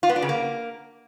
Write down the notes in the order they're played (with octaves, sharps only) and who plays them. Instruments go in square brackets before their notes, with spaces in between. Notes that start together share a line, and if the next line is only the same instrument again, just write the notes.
[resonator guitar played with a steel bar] F4
B3
D4
C#3
A#3